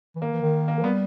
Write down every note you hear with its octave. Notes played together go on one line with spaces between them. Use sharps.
E3
D#3 A#3
E3
D#3
A#3
E3
G3 B3